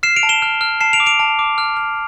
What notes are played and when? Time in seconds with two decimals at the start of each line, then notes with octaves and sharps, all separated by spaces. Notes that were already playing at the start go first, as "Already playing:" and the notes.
0.03 F6 C7 E7
0.16 D7 F7
0.23 A5
0.29 E7 G7
0.42 F6
0.61 F6
0.81 A5 C7 E7
0.93 D7 F7
1.00 D6
1.06 D7 F7
1.19 A5
1.39 D6
1.58 F6
1.77 F6